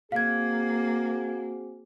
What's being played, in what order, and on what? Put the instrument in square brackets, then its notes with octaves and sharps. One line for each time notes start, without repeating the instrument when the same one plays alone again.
[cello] A#3 [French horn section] C4 F#4 G#4 [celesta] F5 G#6